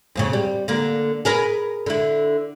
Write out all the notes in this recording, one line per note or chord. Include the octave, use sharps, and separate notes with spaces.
F2 A#2 C#3
G3
D3 A#3
G#4 A#4 B4
D3 E4